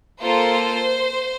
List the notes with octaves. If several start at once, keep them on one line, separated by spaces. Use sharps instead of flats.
A#3 F4 A4 C5